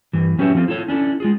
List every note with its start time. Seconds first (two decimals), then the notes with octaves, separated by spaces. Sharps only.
0.13 G2 E3
0.38 F#3 C#4 G4 B4 C#5 E5
0.55 F3 C4 F4 A4 C5
0.68 E4 F4 A4 C#5
0.88 C#4 D4 E4 A4
1.20 G#3 F4 G#4